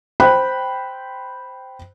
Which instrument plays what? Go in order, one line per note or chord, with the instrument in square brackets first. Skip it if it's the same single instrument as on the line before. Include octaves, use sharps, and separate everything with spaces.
[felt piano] C5 G5 B5 F#6